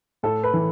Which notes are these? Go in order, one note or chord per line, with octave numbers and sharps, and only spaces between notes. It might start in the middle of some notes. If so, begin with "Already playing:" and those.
A2 A4
B4
E3